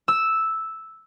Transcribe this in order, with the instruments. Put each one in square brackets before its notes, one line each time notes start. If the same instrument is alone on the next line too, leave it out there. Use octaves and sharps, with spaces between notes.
[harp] E6